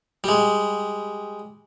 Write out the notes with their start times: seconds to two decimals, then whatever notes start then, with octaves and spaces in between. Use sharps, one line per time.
0.24 G3 G#3